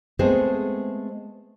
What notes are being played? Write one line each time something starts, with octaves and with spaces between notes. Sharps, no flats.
G#3 A3 B3 C4 G#4 C5